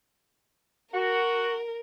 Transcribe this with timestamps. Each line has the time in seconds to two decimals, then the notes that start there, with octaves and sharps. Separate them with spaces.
0.94 F#4 A#4